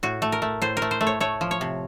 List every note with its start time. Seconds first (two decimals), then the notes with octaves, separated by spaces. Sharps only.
0.03 A2 F#4
0.22 A3
0.32 A#4
0.42 A3
0.62 A2 C5
0.77 A#4
0.82 A3
0.91 C5
1.01 A3
1.07 C#5
1.20 A3 C#5
1.41 F3
1.51 C#5
1.61 C3